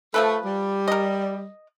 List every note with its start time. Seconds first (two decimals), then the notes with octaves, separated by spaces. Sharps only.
0.14 F3 A3 A4 B4
0.44 G3
0.88 A#4 D#5